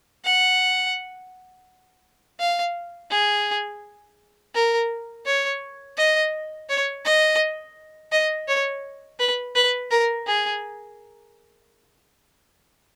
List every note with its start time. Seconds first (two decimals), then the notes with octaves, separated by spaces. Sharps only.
0.25 F#5
2.39 F5
3.11 G#4
4.55 A#4
5.26 C#5
5.97 D#5
6.69 C#5
7.05 D#5
8.12 D#5
8.48 C#5
9.20 B4
9.55 B4
9.91 A#4
10.27 G#4